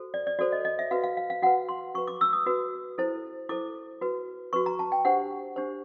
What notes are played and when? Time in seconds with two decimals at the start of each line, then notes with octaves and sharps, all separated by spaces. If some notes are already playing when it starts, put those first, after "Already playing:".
Already playing: F#4 A4 C5
0.14 D5
0.27 D5
0.39 F#4 A4 C5 D5
0.52 D#5
0.65 D#5
0.79 E5
0.91 F#4 B4 F5
1.03 F5
1.17 F5
1.30 F5
1.42 F#4 B4 F#5
1.69 C6
1.94 F#4 B4 C#6
2.07 D6
2.21 E6
2.33 D#6
2.46 F#4 B4
2.98 E4 A4 C5
3.49 E4 A4 C5 D6
4.01 F#4 B4
4.53 F#4 B4 C#6
4.66 A#5
4.79 A5
4.92 G5
5.05 D4 G4 C5 F#5
5.56 D4 G4 C5